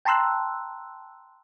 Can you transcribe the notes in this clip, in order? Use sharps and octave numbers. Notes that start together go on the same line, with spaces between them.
G5 A5 A#5 C6 E6 F#6